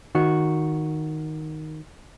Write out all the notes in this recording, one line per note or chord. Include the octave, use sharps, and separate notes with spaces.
D#3 F#4